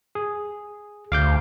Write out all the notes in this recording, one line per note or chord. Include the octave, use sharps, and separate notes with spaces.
G#4
D2 F5 D6 G6